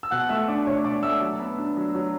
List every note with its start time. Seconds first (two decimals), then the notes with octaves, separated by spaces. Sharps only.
0.03 E6
0.11 B2 F#5 F#6
0.29 A3 E5 E6
0.48 D4 D5 D6
0.67 B2 C#5 C#6
0.85 B2 D5 D6
1.03 A3 E5 E6
1.21 F#3
1.39 B3
1.58 D4
1.77 F#3
1.95 F#3